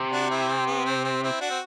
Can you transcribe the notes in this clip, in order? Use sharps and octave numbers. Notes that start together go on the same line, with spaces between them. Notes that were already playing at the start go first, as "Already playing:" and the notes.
Already playing: C3
D4 F#4
C4 E4
C4
B3
C4
C4
C4 E4
D4 F#4
C4